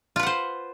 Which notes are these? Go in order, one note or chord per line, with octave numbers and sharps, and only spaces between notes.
F4 B4 C5 F#5